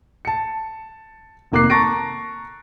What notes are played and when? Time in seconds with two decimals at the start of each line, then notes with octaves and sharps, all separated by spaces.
0.25 A5 C#7
1.52 F1 D#3 A#3 D6 F#6 C7
1.70 A5 A#5 C#6 A6 A#6 D7